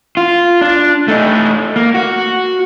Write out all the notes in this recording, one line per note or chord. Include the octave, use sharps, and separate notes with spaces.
F4
D4
A3 D#4
A#3
F#4